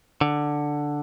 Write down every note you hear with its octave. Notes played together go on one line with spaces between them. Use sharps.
D3